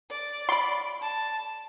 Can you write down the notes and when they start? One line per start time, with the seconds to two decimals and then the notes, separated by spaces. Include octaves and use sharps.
0.11 D5
0.49 B5 C6
1.02 A5